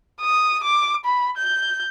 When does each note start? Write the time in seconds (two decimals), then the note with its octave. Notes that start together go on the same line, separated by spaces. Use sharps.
0.21 D#6
0.64 D6
1.05 B5
1.38 G6